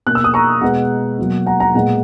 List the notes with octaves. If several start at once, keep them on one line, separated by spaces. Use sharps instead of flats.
B2 A#3 F#6
E6
D#6
A#5 C#6
B2 G#3 B3 F#5
B2 F#3 A#3
F#5 A#5
F#5 A#5
A#2 G#3 B3 F#5